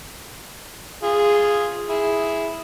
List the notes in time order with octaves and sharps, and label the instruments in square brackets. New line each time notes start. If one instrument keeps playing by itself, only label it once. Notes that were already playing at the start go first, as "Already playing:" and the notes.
[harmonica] F4 G#4
E4 G#4